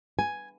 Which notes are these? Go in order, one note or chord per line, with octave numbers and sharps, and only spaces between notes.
G#5